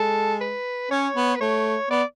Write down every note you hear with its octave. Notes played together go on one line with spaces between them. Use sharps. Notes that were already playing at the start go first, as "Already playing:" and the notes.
Already playing: G#3 A4
B4
C#4 C#5
B3
B4
A3 C#5
B3 D5